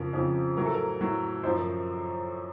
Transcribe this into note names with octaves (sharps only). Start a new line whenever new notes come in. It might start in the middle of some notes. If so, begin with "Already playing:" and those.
Already playing: F2 C#3 F3 A#4
F2 C#3 F3
A2 F#3 A#4
A4
A#4
A2 F#3
F#2 F3 C5
A#4